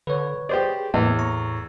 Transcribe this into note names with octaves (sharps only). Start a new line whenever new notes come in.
D3 B4 C#5
G4 G#4 C5 D5
E2 A2 A#3 B3
A#5 C#6